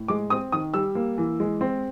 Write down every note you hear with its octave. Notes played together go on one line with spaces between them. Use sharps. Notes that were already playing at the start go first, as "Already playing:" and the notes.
Already playing: A2
G#3 D6
C4 D#6
D#3 D#6
G3 E6
A#3
E3
G#3
C4